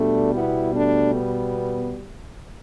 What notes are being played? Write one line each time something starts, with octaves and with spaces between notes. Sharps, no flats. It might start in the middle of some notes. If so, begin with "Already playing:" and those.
Already playing: B2 G3 A3 D4
B3 E4
A3 D4
B3